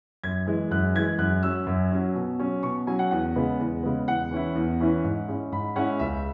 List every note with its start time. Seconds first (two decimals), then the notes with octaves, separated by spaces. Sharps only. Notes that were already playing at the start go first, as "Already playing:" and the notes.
0.24 F#2 G#6
0.47 E3 G#3
0.71 F#2 F#6
0.94 E3 G#3 G#6
1.18 F#2 F#6
1.43 F#3 C#4 E6
1.67 F#2
1.91 F#3 C#4
2.15 B2
2.39 F#3 C#4
2.63 B2 C#6
2.87 F#3 C#4 G#5
2.99 F#5
3.11 E2 F#5
3.35 C#3 G#3 B3
3.59 E2
3.83 C#3 G#3 B3
4.07 E2 F#5
4.31 E3 C#4 E4
4.55 E2
4.80 E3 C#4 E4
5.04 G#2
5.28 G#3 C#4 E4
5.52 G#2 B5
5.76 G#3 C#4 E4 F#5
5.99 C#2 E5